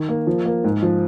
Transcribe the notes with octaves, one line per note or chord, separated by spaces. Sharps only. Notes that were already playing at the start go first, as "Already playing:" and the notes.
Already playing: D#3
A#3
F3
A#3
G#2
F3